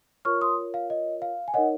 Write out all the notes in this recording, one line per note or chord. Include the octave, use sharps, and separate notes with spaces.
F4 A#4 C#5 C#6 F6
C6 D#6
F5
D#5
F5
G#5
D#4 A#4 C#5 D#5 F#5